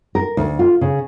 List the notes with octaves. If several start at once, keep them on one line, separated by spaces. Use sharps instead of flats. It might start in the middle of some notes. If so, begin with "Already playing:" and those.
A#4
D2
F4
C#3